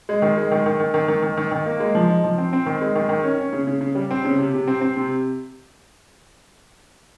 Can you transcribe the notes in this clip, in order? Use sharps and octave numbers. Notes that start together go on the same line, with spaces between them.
G#3
D#3
G#3
D#3
D#3
D#3
D#3
D#3
D#3
D#3
D#3
A#3
G#3
F3
D#4
F3
C4
C4
D#3
G#3
D#3
D#3
C#4
C#4
C#3
C#3
C#3
G3
C4
C#3
C3
C3
C4
C4
C3